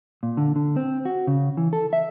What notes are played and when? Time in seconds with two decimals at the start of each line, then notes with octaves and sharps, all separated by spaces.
0.23 A#2
0.37 D3
0.56 D3
0.76 C4
1.05 F#4
1.27 C#3
1.57 E3
1.73 A4
1.93 E5